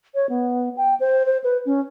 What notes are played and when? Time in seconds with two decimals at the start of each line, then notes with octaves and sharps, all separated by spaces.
0.15 C#5
0.29 B3
0.77 G5
1.00 C5
1.26 C5
1.44 B4
1.66 C#4